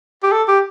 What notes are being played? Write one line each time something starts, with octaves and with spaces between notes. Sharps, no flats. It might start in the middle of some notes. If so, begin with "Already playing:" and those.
G4
A4
G4